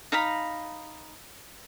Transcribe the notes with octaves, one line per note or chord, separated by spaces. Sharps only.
D#4 F5 A#5 B5